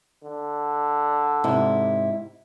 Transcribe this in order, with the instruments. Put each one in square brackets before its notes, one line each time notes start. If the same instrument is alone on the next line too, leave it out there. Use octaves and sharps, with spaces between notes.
[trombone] D3
[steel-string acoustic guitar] G#2 C3 E4